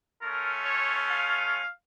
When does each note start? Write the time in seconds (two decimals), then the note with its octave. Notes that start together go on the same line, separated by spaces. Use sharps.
0.22 A3 C#4 F4 A#4
0.65 C#5
1.09 F5